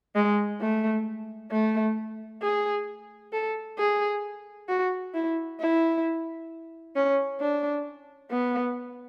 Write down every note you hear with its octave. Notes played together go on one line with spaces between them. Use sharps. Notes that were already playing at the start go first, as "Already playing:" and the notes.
G#3
A3
A3
G#4
A4
G#4
F#4
E4
E4
C#4
D4
B3